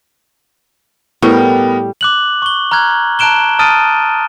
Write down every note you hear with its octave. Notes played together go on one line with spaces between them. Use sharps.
A2 G3 B3 A#4
D6 F#6 F#7
C#6 G7
A#5 F6 F#6 G#6
A5 A#5 F#6 D7 E7 G7
A5 D#6 F6 A6 D7 D#7